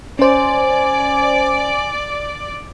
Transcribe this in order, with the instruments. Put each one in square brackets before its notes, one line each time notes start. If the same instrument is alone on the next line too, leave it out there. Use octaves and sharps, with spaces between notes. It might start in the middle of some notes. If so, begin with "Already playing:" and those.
[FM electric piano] C#4 C5 [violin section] D5 [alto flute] G#5